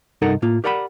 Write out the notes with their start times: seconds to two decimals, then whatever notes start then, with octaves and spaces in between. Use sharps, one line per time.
0.22 C2 G2 D#4 A4 A#4 F#5
0.42 A2 A#3 F4
0.64 G4 A#4 D5 F#5 A#5 B5